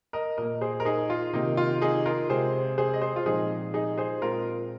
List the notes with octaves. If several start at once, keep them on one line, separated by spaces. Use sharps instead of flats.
A#4 D#5
A#2 A#3 A#4 D#5
G#4 C5
A#4
D#4 G#4
F4
C3 D#3 A#3 D#4
F4
D#4 G#4
F4 A#4
C3 G#3 C4 G#4 C5
G#4 C5
D#5
G#4 C5
F4
A#2 F3 G#3 C4 D#4 G#4
D#4 G#4
G#4 C5
A#2 G#3 C4 F4 A#4